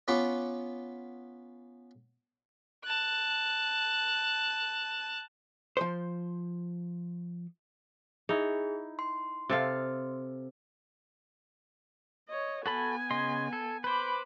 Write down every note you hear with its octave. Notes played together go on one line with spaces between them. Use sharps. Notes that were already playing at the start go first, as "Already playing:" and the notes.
B3 C#4 F4 B4 C6 D6
A5 F#6
F3 C5
D#4 E4 G#4
C6
C3 A4 F5
C#5 D#5
B3 F#4 A4 G#5 B5
C#3 D#5 C6
A4
B4 C5 B5 D6